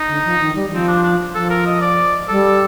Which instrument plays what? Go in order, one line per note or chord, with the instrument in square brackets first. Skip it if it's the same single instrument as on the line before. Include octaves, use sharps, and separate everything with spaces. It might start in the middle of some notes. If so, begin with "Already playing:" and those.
Already playing: [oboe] D#4
[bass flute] D3
F3
D#3
G3
[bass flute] F3 [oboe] C4
[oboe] D4
D4
[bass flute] F3 [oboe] A4
[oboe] A#4
D#5
D5
[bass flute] G3 [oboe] A4